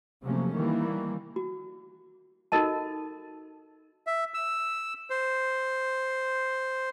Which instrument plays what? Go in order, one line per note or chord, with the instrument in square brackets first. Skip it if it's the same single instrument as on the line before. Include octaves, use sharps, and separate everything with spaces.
[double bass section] C3 F3 F#3 A3 A#3 C#4
D#3 E3 G3 A#3
[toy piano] F#4
D#4 F#4 A4 A#4 D#5 A5
[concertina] E5
E6
C5